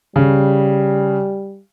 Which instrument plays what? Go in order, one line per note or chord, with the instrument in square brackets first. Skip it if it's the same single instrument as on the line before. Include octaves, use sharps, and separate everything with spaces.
[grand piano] C#3 [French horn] G3